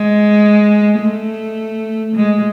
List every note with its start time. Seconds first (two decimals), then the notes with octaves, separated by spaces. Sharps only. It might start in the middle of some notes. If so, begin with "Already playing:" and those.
Already playing: G#3
0.99 A3
2.16 G#3